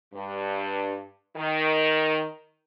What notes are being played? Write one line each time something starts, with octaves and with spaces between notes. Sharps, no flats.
G2
D#3